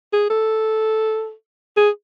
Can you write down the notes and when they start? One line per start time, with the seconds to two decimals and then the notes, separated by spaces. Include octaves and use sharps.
0.13 G#4
0.30 A4
1.77 G#4